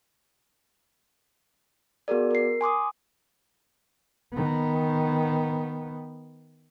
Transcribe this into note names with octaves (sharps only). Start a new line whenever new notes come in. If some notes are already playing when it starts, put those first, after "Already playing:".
B3 F#4 G#4 A#4 D5
A#4 C7
G#5 C6 D6 D#6
D#3 B3